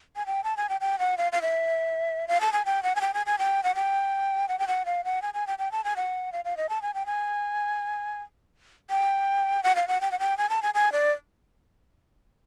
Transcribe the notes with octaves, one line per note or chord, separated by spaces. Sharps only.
G#5
G5
A5
G#5
G5
G5
F#5
F5
F5
E5
F5
A5
G#5
G5
F#5
G#5
G5
G#5
G#5
G5
F#5
G5
F#5
G5
F#5
F5
F#5
G#5
G#5
G5
G5
A5
G#5
F#5
F5
F5
D#5
A5
G#5
G5
G#5
G5
F#5
F5
F#5
G5
F#5
G5
G#5
A5
G#5
G#5
D5